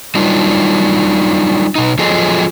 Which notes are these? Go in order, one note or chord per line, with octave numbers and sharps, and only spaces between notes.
F#3 G3 D4 D#4 F4
B2 D#4
F3 F#3 F4 G#4 A4 D#5